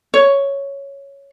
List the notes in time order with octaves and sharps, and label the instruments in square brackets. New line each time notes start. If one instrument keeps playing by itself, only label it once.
[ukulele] C#5